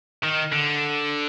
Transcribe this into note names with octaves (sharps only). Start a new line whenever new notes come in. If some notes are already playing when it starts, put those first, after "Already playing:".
D#3
D3